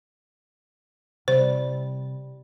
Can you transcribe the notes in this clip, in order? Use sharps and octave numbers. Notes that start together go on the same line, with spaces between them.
C3 G3 E4 C5